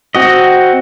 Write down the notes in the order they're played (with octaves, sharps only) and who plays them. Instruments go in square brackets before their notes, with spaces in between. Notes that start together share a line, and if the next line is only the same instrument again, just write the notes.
[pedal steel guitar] C4 F#4 D#5